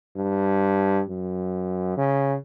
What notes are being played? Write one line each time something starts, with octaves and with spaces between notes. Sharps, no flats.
G2
F#2
C#3